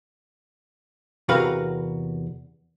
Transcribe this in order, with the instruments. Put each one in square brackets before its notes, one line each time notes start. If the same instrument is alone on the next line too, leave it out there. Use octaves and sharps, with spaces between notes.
[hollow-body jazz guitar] E2 C3 F#4 A#4 B4 F5